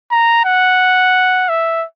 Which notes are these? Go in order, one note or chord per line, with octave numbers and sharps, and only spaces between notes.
A#5
F#5
E5